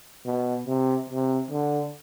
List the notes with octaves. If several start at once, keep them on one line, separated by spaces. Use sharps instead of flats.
B2
C3
C3
D3